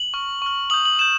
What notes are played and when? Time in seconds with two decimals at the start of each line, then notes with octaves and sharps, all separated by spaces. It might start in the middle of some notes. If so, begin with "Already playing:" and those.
Already playing: F#7
0.14 C#6 F6
0.42 C#6 F6
0.70 D#6 G6 F#7
0.85 F#7
0.99 D#6 G6 E7